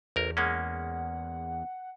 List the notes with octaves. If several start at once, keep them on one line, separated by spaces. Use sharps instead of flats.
A1 E2 A#4
G#3 A#3 C#4 F#5